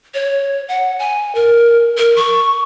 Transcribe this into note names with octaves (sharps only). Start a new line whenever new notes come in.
C#5
F#5
G#5
A#4
A#4
C#6